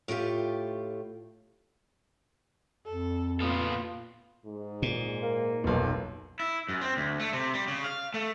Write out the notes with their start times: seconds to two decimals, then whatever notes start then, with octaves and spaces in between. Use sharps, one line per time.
0.08 A2 A3 F4 G4
2.87 F2 A4
3.41 A#2 B3 F4 A4
4.46 G#2
4.82 A#2
5.23 A#3
5.64 F1 B1 B2 A#3
6.40 E4
6.69 F#2
6.81 C4
6.97 D2
7.20 A3
7.33 C3
7.54 G3
7.68 C#3
7.84 F5
8.14 A3